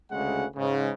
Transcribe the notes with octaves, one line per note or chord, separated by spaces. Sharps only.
D2 C#3 G#3 F#5
G#2 C#3